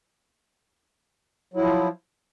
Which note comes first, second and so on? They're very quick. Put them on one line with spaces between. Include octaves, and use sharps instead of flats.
F#3 E4 F3